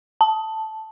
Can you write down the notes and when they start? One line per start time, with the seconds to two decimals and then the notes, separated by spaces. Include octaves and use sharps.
0.21 A5